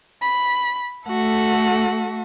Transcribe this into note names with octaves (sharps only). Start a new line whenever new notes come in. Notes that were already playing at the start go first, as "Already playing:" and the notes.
B5
A3 F#4 A4